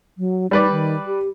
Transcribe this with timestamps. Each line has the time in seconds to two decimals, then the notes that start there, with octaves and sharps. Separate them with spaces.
0.18 F#3
0.51 G3 D#4 B4 D5
0.71 D#3
1.06 G4